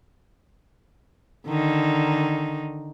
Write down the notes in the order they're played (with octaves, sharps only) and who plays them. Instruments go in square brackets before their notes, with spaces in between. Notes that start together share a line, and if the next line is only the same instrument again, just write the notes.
[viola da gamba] D3 D#3 D#4